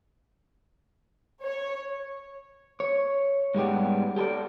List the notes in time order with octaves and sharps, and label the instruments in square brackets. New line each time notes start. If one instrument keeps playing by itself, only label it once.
[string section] C#5
[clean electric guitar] C#5
G#2 G3 G#3 B3 G4
G4 A4 B4 D5